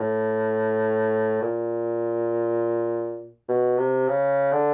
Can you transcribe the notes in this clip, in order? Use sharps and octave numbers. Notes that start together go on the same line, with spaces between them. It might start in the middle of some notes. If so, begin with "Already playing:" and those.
Already playing: A2
A#2
B2
C3
C#3
D3